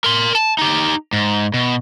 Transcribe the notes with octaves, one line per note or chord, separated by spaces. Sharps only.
A#4 C6
A5
D#4 G4
G#2
B2